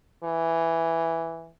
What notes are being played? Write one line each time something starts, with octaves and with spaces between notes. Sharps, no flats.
E3